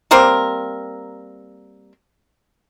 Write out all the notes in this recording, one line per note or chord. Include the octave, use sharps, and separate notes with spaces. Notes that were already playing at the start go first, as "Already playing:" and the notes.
G3 A#3 C4 A#4